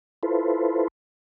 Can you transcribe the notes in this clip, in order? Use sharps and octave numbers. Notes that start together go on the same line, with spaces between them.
E4 F4 A4 B4 C5